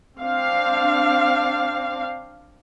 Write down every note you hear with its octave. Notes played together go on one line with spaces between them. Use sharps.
C4 D4 F5